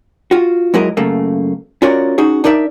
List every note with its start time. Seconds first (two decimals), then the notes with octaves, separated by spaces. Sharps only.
0.31 F4 F#4
0.74 F#3 G#3 E4 F#4 A#4 D#5
0.97 F#2 C#3 A3 A#3
1.82 C#4 F4 F#4 A#4 C#5 D5
2.18 C#4 D#4 F#4 G#4
2.44 D4 D#4 A#4 D5 E5